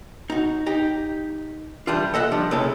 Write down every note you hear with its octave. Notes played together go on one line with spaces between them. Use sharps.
D#4 F#4
D#4 G4
E3 G3 D4 F4
A4 D#5 E5 F#5
F3 G3 D4
B1 C#3 G#3 C#4 E4 A4